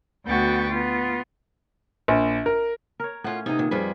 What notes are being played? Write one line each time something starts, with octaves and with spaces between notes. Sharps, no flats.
D2 B3 F#4 G5 C#6 A6
B3 F4
A#1
A#4
A#4 C#5
A2 C#4 F4 F#5
C3 B3 D#4 G#4
A#2 D#3
F2 G3 F4 G#4 B4